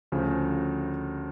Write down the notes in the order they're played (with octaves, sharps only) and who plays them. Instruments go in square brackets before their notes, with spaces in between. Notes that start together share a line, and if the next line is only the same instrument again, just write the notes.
[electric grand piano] D2 C#3 F3